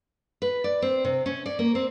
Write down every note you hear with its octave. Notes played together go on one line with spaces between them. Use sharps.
B4
D5
C4
C3
C#4
D5
A#3
C4